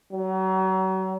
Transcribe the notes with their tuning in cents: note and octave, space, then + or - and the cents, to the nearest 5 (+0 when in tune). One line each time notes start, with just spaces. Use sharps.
F#3 +35